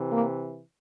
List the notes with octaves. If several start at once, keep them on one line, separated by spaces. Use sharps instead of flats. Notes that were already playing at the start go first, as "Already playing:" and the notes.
Already playing: C3 E3
A#3